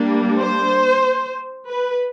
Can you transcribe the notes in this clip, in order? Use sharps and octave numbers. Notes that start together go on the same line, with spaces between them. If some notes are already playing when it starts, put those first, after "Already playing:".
Already playing: G3 A#3 D4
C5
B4